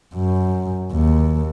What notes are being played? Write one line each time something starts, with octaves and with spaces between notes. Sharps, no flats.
F#2
D#2